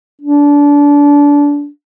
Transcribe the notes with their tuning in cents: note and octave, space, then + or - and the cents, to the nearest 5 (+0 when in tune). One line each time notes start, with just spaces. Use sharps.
D4 -25